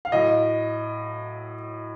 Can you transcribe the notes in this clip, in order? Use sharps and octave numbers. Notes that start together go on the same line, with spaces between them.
F5
A2 F#3 D#5